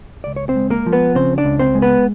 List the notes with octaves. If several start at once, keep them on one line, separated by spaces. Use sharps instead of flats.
C#2 D5
C#5
C4 C5
G#3
A#3 A#4
F3
B3 B4
C#3 C4 C5
D4 D5
C#2
C4 C5
G#3
B3 B4